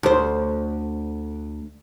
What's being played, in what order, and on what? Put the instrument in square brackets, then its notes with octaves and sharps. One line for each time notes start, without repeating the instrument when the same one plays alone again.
[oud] D2 C5